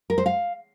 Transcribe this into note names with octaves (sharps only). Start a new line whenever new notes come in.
A#4
C5
F5